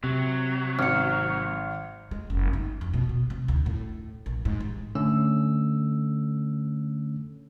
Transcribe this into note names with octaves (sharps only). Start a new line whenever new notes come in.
C3 F#3
G#1 F6 C#7
G#3
F#1
D#4
F2
B2
B2
C3
D2
A2
A#1
G#2
A1
D3 A3 C#4 E6